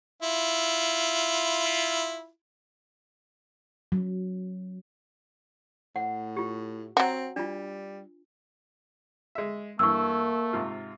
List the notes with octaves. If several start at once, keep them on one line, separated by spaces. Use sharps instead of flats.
E4 F4
F#3
A2 F#5
F4 G4
F#3 C4 F#4
G3 D4 F4
G#3 E5
G2 E3 A3 A#3 C#6 E6
G#2 C3 F4